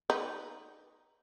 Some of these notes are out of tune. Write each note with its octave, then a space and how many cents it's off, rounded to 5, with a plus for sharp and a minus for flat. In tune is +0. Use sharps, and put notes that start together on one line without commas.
D#4 +0 B4 +0